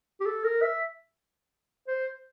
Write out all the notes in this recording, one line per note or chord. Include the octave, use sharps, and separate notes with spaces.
G4
A4
A#4
E5
C5